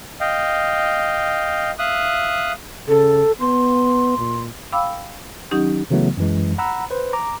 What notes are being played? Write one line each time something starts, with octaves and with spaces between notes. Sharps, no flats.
D#5 F5 G5
E5 F5 D#6 F#6
C#3 A4
B3 C6
A#2
F5 G5 B5 D6 E6
D#3 F#3 C#4 D#4 G4
C#3 E3 F#3 A3 B3
F#2 E3 G#3
F#5 A#5 B5 E6
B4 C5
A#5 D6